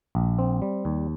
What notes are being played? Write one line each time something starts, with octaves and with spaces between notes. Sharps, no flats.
A#1
C4
G3
D#2